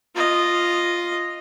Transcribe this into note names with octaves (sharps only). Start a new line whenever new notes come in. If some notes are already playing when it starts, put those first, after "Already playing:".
F4 D#5